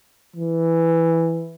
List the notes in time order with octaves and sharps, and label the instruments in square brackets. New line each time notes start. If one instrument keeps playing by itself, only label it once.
[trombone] E3